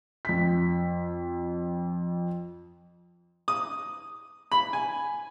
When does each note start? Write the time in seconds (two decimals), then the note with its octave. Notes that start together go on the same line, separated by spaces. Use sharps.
0.25 F2 B6
3.48 D#6
4.52 B5
4.73 G#5